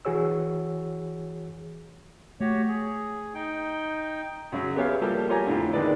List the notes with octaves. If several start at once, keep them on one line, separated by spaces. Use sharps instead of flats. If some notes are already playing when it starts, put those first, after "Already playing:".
E3 F#4 G#4 C#5 E6
A3 F#4 G4 C#5
G#4
D#4 G5
F#2 C#3 F#3
B3 G4 G#4 C#5 E5 F5
F3 G3 A#3 G4 A4
F4 G4 C#5 G#5 A#5
F2 A2 D3
D3 D#3 G#3 A#3 B4 D5